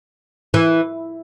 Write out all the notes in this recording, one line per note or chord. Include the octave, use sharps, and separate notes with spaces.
E3